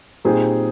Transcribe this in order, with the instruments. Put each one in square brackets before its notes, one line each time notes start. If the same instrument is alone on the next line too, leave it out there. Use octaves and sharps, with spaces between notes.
[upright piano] A#2 G3 C4 D#4 G#4